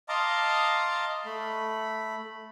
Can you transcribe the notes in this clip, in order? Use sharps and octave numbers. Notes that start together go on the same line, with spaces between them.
D#5 F5 A5 A#5 C6 D6
A3 B5